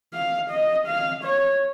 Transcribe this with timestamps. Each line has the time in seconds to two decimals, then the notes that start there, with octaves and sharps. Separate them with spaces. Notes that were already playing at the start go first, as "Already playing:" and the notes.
0.14 F5
0.51 D#5
0.87 F5
1.24 C#5